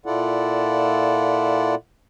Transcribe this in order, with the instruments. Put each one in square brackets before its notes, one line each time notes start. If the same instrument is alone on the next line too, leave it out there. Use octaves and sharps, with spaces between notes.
[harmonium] A#2 E4 F4 A4 D5 F#5